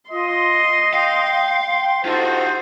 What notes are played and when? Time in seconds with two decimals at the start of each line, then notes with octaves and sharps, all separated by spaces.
0.11 F4 D#5 C6
0.94 F5 G5
2.05 D#4 F4 F#4 A4 C5